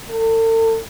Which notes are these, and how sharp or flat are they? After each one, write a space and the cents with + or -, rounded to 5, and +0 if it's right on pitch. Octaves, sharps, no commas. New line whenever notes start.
A4 +40